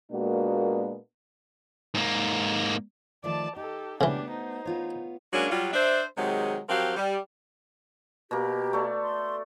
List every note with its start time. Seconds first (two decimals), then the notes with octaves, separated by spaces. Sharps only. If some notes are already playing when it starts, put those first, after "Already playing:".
0.11 A#2 G#3 A#3 B3 D4 F#4
1.94 G#2 A#3
3.24 D#3 F3 A3 D5 A5
3.56 D#4 G4 A4
4.01 C#3 E3 A3 B3 D4 F#4 G4
4.31 D#4 C5
4.65 B3 F4 C#5
5.33 F#3 G#3 A#3 C#4 D4
5.50 F#3 G3 F4
5.73 D4 C5 E5
6.17 C3 D#3 F#3 G#3
6.69 F3 F#3 C4 G4 A#4 F5
6.97 G3
8.31 B2 A#3 G4
8.73 A3 D5
9.02 C6